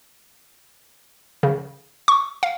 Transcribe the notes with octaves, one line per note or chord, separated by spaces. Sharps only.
C#3
C#6
F5